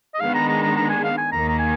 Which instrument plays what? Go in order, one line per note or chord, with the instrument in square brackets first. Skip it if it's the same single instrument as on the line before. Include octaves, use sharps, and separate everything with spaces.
[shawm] D#5
[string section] D#3 G#3 B3 D4 [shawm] F5
[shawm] A#5
A#5
A#5
A#5
G#5
F5
G#5
[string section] D#2 D#3 A#3 [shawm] A#5
[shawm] A#5
G#5